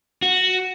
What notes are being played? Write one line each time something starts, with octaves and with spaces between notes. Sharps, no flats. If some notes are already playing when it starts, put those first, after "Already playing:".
F#4